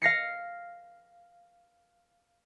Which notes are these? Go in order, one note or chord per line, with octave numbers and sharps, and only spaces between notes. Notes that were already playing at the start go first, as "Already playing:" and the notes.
F5 A#6 C7 C#7